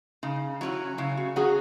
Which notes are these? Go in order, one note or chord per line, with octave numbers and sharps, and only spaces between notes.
C#3 D#4
F#3 C#4 E4 F#4
C#3 E4
F#4
F#3 C#4 F#4 G#4